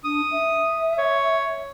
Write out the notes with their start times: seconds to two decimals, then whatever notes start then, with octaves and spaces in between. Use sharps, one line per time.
0.04 D4 D#6
0.31 E5
0.98 C#5